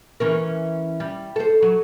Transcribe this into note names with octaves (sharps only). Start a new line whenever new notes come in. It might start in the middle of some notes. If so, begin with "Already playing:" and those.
E3 C#4 A#4
G3
A4 C5
F#3